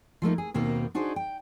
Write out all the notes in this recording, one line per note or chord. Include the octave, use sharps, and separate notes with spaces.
F3 A3 A#3 D#4
G#4
D#2 B2 A#3 C4 D#4
D4 D#4 F#4 G#4 C5
G5